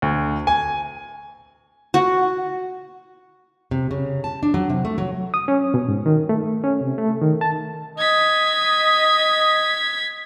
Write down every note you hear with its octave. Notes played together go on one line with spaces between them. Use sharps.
D2
G#5
F#4
C3
C#3
A5
D4
F#3
C3
A3
F#3
D#6
C#4
B2
G#2
D#3
A3
C#4
C3
A3
D#3
A5
D#5 G#6 B6